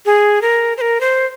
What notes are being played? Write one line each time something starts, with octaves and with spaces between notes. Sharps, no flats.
G#4
A#4
C5
A#4
C5